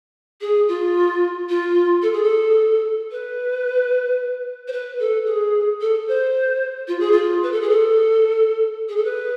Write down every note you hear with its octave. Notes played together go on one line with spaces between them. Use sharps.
G#4
F4
F4
A4
G#4
A4
B4
C5
B4
A4
G#4
A4
C5
F4
G#4
F4
B4
A4
G#4
A4
G#4
A4
B4